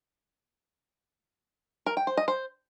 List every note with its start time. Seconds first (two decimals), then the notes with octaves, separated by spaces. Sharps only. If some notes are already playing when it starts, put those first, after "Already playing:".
1.86 A#4
1.97 G5
2.07 C5
2.17 D#5
2.28 C5